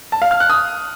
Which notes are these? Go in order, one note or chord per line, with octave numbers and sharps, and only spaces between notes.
A5
F5
F6
F#6
D#6